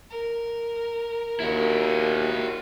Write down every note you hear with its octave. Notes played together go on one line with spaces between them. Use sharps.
A#4
D#2 E4 F#4